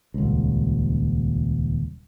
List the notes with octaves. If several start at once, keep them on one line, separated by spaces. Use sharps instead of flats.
D#1 C#2